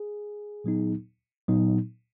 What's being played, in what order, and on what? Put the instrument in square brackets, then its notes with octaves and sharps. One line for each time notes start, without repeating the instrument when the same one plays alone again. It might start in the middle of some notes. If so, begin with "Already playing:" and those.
Already playing: [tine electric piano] G#4
A#2 F#3 B3 D#4
A#2 F#3 B3 D#4